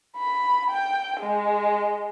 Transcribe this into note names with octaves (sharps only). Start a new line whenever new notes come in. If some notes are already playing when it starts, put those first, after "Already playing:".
B5
G5
G#3